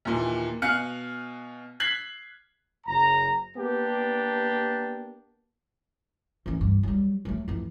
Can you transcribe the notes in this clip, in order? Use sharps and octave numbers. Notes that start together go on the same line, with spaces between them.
D#2 A#2 E3
B2 F5 G#5 F6 F#6 C#7
F#6 G#6 B6 C7 F#7
F#1 A#5
A#3 B3 D4 G4
E3 C#4
G2
F#3 G3
F#3 A3
F2 E3